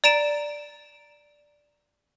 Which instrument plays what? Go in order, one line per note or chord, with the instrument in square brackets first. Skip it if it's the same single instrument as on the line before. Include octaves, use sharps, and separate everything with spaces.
[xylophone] D5 A#5 D7 E7